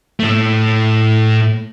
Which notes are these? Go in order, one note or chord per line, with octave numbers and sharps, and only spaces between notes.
A2 A3